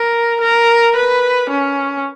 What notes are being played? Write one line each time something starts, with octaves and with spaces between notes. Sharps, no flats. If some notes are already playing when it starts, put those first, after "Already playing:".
Already playing: A#4
A#4
B4
C#4